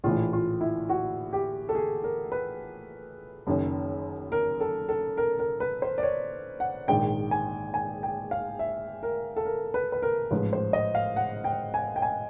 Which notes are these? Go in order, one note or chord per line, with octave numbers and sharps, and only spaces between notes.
A#1 A2 E3 F4
F4
E4
F#4
G4
A4
G#4
A#4
B4
F#1 F#2 D#3
A#4
A4
A4
A#4
A#4
B4
C5
D5
C#5
F#5
A#1 G#2 D#3 G5
G#5
G#5
G5
F5
E5
A#4
A4
A#4
B4
B4
A#4
A1 G#2 F3 B4
C5
D#5
F5
F#5
G5
G#5
G5
G#5